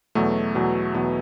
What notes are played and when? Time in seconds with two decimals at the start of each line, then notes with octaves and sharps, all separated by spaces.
0.15 E2 B2 F#3 A3
0.55 E2 B2 F#3
0.94 E2 B2 F#3 B3